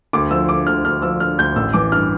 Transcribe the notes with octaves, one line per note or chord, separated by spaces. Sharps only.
D2 D6
F3 E6
D3 D6
D2 F6
D2 F6
F3 E6
D3 F6
D2 G6
A1 E6
E3 D6
G2 F6